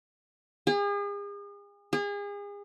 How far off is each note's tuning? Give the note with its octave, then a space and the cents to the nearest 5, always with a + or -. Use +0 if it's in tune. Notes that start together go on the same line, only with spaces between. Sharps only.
G#4 -40
G#4 -35